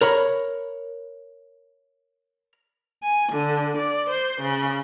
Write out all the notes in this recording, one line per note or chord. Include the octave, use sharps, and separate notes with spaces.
A#4 C#5 B5
G#5
D3
D5
C5
C#3